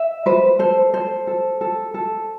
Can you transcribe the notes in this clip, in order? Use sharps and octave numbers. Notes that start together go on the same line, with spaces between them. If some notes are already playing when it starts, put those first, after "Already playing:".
Already playing: E5
B4 C5
A4 C5
A4 C5
A4
A4
A4